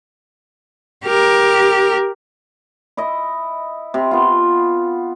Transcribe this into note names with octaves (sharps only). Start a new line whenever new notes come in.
G4 A#4
E4 D#5
C3
B3 F4